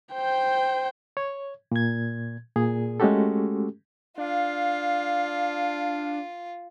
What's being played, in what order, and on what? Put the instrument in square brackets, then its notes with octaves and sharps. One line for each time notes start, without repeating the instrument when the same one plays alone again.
[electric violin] C5 G5
[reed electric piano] C#5
A#2 G#6
A#2 G#4
G#3 A3 C#4 F#4 G4 A4
[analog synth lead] D4 [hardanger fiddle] F4 [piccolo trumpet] F5